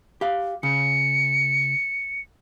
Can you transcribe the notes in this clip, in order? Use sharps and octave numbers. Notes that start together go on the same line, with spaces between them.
G4 F5
C#3 C#7